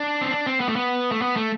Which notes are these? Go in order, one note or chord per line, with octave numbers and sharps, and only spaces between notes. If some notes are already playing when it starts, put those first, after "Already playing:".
Already playing: D4
C4
D4
C4
B3
A3
B3
A3
B3
A3